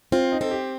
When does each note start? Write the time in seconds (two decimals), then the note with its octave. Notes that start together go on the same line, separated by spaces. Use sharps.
0.12 C4 F4
0.32 D#4
0.41 C4 A4
0.51 G4